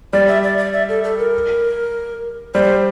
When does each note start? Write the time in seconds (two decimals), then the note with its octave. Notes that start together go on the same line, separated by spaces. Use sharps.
0.13 G3 D5
0.28 E5
0.43 D5
0.58 D5
0.73 E5
0.89 A4
1.04 A4
1.18 A#4
2.54 G3 C5